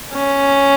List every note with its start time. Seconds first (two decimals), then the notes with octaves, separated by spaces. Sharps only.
0.13 C#4